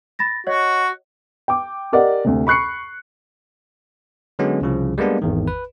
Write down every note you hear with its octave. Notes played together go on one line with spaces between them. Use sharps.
B5 A6 A#6
F#4 C#5 D#5 F#5
G5 D6
G4 A#4 D5 D#5 F#5
D2 C3
B5 C#6 F#6 C7 C#7
D3 F#3 G#3 B3 C#4
C2 C#3 F3
G3 G#3 A#3 B3 D4
G#1 E2 D#3
B4